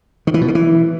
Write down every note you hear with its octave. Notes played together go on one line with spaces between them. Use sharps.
D#3
E3
B2
C#3
E3